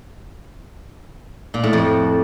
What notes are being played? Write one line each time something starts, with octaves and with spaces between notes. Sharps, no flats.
A#2
A2
F2